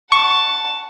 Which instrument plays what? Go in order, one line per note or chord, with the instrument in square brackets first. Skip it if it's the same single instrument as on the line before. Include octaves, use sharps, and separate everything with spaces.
[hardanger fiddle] F#5 A5 [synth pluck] C#6